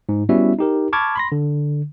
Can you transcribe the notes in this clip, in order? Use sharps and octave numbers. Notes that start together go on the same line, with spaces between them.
G#2
G3 B3 C#4 E4 F#4 E5
D#4 G4 A#4
A5 B5 C#6 D6 F6 G#6
B5 C6 A#6
D3